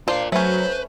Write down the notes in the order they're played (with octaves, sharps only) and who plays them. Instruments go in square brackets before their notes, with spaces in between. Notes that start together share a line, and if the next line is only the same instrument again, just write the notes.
[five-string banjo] D4 C5 [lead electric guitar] F4 A#4 [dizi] F5
[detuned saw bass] F#3 [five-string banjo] A3 C#4 [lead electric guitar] B4 [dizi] C5